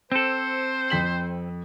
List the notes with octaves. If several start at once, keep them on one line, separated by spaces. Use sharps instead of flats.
C4 A4 C5
F2 B6 F#7